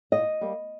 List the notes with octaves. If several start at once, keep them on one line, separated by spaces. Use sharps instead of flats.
A#2 D#5
G3 A#3